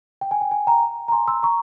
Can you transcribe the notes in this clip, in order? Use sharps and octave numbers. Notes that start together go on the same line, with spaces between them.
G5
G#5
G5
G#5
G5 A#5
A#5
G#5 C6
C6 E6
A#5 C#6